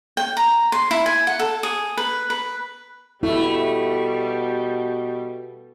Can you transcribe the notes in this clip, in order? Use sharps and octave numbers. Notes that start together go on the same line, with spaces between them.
G5
A#5
C6
E4
G#5
F#5
A4
G#4
B4
B4
B2 G3 A3 E4